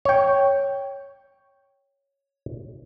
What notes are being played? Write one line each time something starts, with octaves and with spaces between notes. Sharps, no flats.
C#5 G5